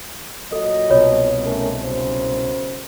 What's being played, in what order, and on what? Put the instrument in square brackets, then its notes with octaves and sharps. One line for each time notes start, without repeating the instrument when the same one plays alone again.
[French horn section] A#2 F#3 D#5 [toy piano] A4
[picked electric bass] C2 B2 [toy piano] F4 C#5
[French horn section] A3 C#4 A#4
F#2 C#3 C5